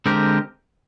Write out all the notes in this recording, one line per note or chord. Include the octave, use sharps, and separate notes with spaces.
D3 G#3 C4 G4 A#4